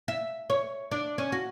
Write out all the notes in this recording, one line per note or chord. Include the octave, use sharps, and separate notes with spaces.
E5
C#5
D4
C#4
F#4